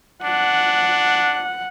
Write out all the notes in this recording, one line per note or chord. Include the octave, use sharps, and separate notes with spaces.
D4 F#5